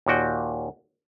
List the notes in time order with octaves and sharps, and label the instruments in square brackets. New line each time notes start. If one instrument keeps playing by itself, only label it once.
[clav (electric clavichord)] D#2 A#2 F#4 G5